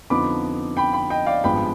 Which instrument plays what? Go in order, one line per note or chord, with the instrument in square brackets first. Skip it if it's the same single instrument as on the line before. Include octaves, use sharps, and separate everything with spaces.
[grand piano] F2 D3 F3 B3 D#4 B5 D6
G5 B5
G5 B5
D#5 G5
D5 F5
G#1 G2 F3 G#3 B3 G5 B5